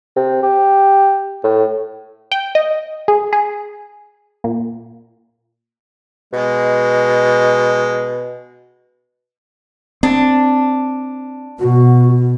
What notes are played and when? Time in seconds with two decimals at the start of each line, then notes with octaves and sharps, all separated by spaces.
0.16 C3
0.43 G4
1.44 A2
2.32 G5
2.55 D#5
3.08 G#4
3.33 G#4
4.44 A#2
6.33 B2 G#3
10.03 C4 D4
11.60 B2 F#4